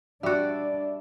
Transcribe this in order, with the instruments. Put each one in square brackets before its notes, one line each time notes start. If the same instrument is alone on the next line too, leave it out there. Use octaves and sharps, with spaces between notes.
[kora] G3 F#4 [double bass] D4 [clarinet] D5 [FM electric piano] E5